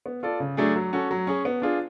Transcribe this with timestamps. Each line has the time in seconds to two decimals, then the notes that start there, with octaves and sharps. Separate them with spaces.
0.06 B3
0.23 F4 A4 D5
0.40 C#3
0.57 F#3 A3 D4 G#4
0.76 F#3
0.93 C#4 F#4 A4
1.11 F#3
1.27 C#4 G#4
1.45 B3
1.62 D4 F4 G#4